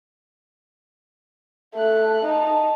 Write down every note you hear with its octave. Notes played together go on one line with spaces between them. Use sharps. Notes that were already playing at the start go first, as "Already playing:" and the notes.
A3 F#6
D#4 A5